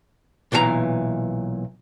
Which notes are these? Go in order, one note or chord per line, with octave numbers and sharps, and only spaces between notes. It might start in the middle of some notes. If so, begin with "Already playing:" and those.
B1 A#2 E3 F#4 A#5